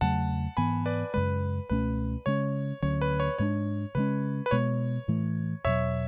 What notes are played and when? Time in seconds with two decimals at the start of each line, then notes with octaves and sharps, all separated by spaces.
0.01 E2 C#3 F#3 A3 F#5 A5
0.57 G#2 E3 B3 G#5 B5
0.86 B4 D5
1.14 F#2 C#3 G#3 B4
1.69 C#2 B2 A3 C#4 B4
2.26 C#3 G#3 C#4 C#5
2.82 D2 D3 F#3 C#4 C#5
3.02 B4
3.20 C#5
3.38 G#2 G#3 D4 C#5
3.95 C#3 E3 G#3 C#4 B4
4.46 B4
4.51 B2 G#3 B3 C#5
5.08 A2 E3 A3
5.64 E2 B2 F#3 C#5 E5